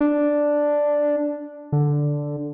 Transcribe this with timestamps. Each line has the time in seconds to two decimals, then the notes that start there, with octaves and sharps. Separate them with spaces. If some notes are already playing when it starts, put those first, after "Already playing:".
0.01 D4
1.72 D3